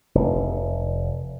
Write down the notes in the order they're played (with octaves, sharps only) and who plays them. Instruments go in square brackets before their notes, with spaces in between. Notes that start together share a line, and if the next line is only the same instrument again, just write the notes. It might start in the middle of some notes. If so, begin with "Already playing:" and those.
[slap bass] F1